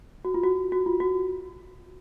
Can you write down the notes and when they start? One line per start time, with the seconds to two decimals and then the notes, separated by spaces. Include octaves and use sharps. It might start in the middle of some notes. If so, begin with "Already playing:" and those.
0.25 F#4
0.34 F4
0.44 F#4
0.72 F#4
0.86 F4
1.00 F#4